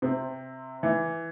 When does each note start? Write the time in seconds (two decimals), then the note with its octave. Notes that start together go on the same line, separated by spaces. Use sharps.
0.02 C3 C4
0.83 E3